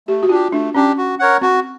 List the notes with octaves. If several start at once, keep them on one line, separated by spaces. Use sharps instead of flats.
A3 G4
F#4
D4 F4 G4
A3 D4
C#4 D4 G4
F#4
A#4 C#5 F#5
C4 F#4